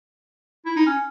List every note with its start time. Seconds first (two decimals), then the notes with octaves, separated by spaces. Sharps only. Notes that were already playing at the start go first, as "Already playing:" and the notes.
0.66 E4
0.76 D#4
0.86 C#4